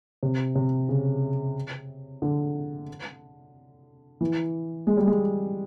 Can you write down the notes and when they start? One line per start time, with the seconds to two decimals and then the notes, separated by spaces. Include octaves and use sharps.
0.23 C3
0.55 C3
0.89 C#3
2.22 D3
4.21 E3
4.87 G#3
4.97 G3
5.07 G#3